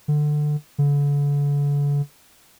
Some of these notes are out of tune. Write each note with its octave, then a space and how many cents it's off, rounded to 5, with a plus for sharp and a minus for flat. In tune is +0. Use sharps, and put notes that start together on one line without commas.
D3 +20
D3 -40